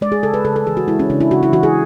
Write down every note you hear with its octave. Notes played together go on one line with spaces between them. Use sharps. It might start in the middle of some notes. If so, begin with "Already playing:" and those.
G#3 D5
G#4
C#3 A4
B4
C#3 A4
A4
E3 G#4
F#4
G#3 E4
C#4
C#3 D4
E4
C#3 F#4
E4
E3 F#4
G#4